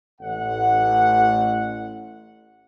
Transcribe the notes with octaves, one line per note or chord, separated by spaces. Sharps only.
A1 F#5